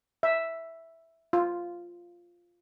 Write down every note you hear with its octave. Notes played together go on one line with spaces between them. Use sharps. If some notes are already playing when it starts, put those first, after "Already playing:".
E5
F4